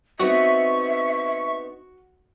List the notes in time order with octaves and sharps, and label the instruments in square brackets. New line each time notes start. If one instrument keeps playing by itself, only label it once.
[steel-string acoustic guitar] B3 C4 D#4 [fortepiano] F#4 [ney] E5 [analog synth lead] C#6